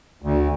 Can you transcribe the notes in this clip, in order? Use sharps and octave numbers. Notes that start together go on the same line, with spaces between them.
D2